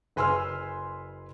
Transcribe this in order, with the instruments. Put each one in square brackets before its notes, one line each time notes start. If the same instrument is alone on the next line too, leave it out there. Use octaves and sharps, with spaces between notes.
[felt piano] F#1 B4 G#5 C6 E6 F6